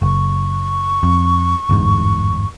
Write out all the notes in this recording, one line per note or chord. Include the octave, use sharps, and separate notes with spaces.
F#1 C#6
F2
G1 E2 G#2